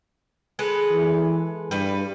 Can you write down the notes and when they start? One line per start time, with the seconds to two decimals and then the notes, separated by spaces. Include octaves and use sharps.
0.59 G#3 A4 B4
0.90 E3
1.71 G2 G3 B4